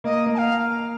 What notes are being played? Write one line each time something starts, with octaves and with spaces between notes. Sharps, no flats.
A#3 D#5
A#3
A5
F5